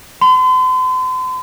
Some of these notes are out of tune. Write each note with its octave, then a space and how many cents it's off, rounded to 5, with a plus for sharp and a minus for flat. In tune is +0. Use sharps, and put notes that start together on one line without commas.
C6 -40